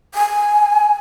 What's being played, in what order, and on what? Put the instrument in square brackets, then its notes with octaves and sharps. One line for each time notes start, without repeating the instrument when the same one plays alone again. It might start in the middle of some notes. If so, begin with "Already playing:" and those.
[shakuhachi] G#5